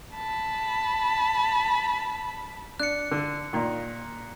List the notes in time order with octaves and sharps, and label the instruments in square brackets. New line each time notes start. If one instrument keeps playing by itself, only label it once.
[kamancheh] A5 B5
[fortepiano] D4 [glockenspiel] F#6 C#7
[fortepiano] D3
A#2 D#3